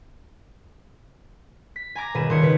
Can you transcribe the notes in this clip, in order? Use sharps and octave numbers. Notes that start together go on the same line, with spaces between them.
B6
G#5 A#5 D6 A#6
D#1 B2 G#4 B5 D#7 E7
D#1 D#2 C6 D#6 G#6 C#7
C#3 G#4 B4